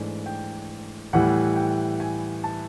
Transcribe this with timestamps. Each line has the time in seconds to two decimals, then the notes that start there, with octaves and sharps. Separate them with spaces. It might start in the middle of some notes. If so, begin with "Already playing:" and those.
Already playing: G#2 E3 A3 D4
0.26 G5
1.13 A2 E3 G3 F#5
1.56 G5
2.00 G#5
2.44 A5